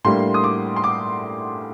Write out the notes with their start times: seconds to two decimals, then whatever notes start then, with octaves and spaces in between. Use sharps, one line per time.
0.04 A2 G3 A#3 D4 C6
0.34 D#6
0.44 D6
0.76 C6
0.84 D6